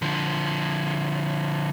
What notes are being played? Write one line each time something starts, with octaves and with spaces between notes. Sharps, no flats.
D3 F3